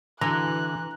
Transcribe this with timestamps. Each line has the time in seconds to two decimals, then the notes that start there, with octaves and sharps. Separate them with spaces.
0.21 D3 E3 F#4 A#5 F#6